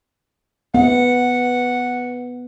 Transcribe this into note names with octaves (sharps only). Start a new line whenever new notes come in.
B3 F#5